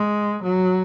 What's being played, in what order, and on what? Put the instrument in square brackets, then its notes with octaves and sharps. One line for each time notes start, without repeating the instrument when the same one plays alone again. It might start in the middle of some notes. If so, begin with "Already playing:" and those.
Already playing: [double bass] G#3
F#3